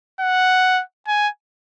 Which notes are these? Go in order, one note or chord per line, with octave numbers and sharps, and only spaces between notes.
F#5
G#5